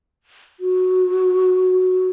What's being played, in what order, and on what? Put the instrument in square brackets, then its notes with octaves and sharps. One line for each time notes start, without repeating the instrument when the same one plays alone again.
[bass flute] F#4